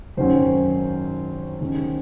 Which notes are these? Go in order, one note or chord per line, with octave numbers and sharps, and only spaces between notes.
G#1 F#2 D#3 F#3 C#4 C5
D#2 D#3 G#3 C#4